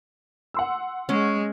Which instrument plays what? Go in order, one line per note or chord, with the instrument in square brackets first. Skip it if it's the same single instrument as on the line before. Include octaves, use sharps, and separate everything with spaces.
[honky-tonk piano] F#5 C6 E6
[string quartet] G#3 [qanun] C#4